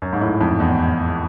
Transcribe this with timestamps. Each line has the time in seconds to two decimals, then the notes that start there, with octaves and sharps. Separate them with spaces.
0.02 F#2
0.13 G#2
0.21 A2
0.41 F2
0.60 E2